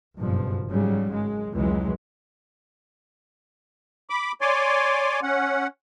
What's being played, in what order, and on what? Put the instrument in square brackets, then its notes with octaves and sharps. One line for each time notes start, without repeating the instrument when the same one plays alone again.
[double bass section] F#1 G2 B2 F3
G#2 C#3 F#3 G3
G#1 G#3
F1 C#2 E3 F#3 G#3
[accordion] B5 D6
C#5 D5 G#5 C6 D6
C#4 F#5